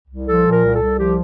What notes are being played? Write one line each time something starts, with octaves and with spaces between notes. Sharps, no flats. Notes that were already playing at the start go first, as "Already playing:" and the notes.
C2
F3 A4
A#2
A#4
C2
A4
C2
F3 G4